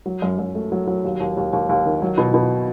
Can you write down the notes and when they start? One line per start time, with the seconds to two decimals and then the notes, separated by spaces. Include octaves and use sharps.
0.06 F#3
0.22 F#2
0.39 F#2
0.55 A3
0.72 F#3
0.87 F#3
1.04 D#2
1.20 D#2
1.37 D#2
1.53 D#2
1.69 D#2
1.86 D#3
2.02 F#3
2.18 B2
2.34 B2